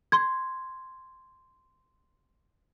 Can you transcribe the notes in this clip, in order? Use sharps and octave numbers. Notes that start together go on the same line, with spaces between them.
C6 G#6